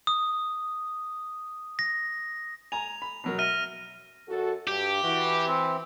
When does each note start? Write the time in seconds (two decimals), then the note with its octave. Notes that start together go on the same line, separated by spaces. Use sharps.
0.07 D#6
1.79 A#6
2.72 G#5 A#5 F7
3.02 B5
3.24 B2 F#3 A#4
3.39 E5 F6 A#6 D#7
4.29 F#2 F#4 A4
4.68 G2 G4
5.03 E3 F#4
5.47 C4